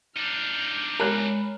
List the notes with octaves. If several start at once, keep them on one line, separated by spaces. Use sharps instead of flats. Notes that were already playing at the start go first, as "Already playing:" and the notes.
D4 D#4 F6 G6
G#3 A#4 C#5 B5 F#6